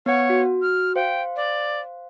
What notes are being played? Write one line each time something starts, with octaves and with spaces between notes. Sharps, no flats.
B3 C#5 F#5
F#4
F6
C5 F5 G5
D5